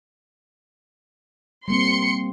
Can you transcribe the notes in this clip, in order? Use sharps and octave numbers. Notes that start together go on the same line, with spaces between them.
G3 A#3 C4 C6 C#7